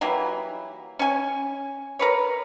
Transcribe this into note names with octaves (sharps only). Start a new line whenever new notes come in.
E3 F#3 G3 A#3
C#4 G#5
A#4 B4 C#5